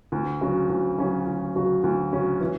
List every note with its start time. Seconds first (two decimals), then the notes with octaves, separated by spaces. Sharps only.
0.12 D2
0.41 C#3 F#3 C#4 F#4
0.69 D2
0.98 C#3 F#3 C#4 F#4
1.26 D2
1.55 C#3 F#3 C#4 F#4
1.83 D2
2.13 C#3 F#3 C#4 F#4
2.41 E3